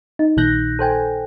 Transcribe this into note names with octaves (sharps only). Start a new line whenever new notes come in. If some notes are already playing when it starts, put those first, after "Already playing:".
D#4
A#1 A#2 D#3 F#6 G6 A#6
A4 C5 G5 G#5